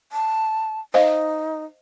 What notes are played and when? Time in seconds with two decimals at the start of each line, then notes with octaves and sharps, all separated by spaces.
0.12 A5
0.94 D#4 C5 D#5 F5